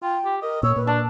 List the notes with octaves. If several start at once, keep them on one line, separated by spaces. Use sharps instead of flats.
F4 G5
G4
A#4 D#5
A#2 C#5 E6
A#2 B4
D4 A5